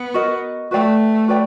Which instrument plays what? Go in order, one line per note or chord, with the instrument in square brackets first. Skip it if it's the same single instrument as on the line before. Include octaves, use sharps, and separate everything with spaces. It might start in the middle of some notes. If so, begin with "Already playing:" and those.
Already playing: [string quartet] B3
[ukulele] F#4 A#4 D#5
[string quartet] A3 [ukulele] F#4 B4 D5 G5
[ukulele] F#4 B4 D5 G5